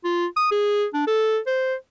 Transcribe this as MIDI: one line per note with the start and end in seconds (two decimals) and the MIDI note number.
0.04 0.26 65
0.37 0.47 87
0.52 0.86 68
0.94 1.02 62
1.07 1.39 69
1.47 1.75 72